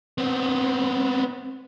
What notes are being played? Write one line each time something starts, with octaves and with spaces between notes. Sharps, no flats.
B3 C4